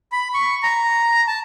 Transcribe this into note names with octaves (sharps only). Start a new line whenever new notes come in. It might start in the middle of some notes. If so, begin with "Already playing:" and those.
B5
C#6
A#5
A5